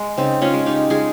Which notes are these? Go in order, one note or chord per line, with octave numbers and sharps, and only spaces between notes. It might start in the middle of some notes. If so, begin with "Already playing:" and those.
Already playing: G#3
C#3 C4 D#4
C#4 F4
G#3
D#4 G4
G#3 F4 G#4